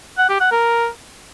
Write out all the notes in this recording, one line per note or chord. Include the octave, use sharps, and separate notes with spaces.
F#5
G4
F#5
A#4